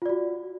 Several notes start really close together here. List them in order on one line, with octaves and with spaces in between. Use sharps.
F4 D5 F#4